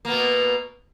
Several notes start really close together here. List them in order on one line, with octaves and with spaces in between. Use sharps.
A#3 B3 B2